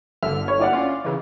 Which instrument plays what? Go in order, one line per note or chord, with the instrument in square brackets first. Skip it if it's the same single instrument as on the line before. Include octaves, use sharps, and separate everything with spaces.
[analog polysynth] G1 D3 F6 [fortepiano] E5
[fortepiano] C#5
E4 D5 F#5
[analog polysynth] C#4 F4
C#3 E3